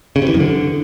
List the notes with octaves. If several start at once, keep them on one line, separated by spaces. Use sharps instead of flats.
C#3
C3
E3
F#2
D3